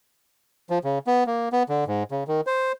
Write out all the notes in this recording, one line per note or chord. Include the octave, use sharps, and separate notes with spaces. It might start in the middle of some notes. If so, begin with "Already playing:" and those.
F3
C#3
B3
A#3
B3
D3
G#2
C#3
D#3
C5